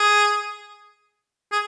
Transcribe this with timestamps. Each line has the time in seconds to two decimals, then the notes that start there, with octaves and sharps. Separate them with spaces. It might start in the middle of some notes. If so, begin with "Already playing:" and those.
Already playing: G#4
1.52 G#4